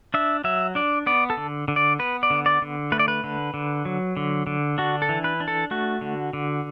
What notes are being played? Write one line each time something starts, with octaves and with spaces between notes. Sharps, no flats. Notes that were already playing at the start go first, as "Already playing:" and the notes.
D4 E5
F#3 E5
D4 D5
B3 D5
A4
D3
D3
D5
B3 B4
D5
D3
D5
D3
A3 B4
D5
B4
D3
D3
F#3
D3
D3
D4 F#4
A4
E3
B4
D4
A4
A3 F#4
D3
D3